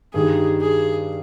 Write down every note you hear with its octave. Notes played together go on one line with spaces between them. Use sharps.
G2 D#3 G3 G#4
G#4